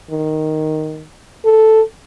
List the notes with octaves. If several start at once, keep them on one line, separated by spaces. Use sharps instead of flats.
D#3
A4